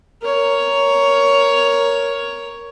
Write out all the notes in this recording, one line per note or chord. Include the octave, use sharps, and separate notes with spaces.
A#4 C#5